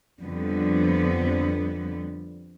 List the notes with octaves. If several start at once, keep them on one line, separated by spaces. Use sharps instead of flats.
F2 D3 G3 B3